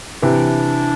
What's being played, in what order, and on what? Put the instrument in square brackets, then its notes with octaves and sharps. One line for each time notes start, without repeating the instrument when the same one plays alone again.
[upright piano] C3 E3 [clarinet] D4